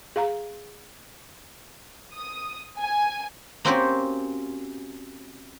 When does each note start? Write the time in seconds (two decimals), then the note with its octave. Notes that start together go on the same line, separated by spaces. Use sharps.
0.16 G#4 F5 A#5
2.15 D#6
2.79 G#5
3.65 A#3 C4 C#4 F#4 G4 C5